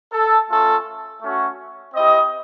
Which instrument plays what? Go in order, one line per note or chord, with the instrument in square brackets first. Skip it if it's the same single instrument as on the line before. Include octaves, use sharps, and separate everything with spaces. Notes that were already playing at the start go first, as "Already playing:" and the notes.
[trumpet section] A4
A3 C#4 F4 A4
A3 C#4 F#4
C4 E4 G4 D#5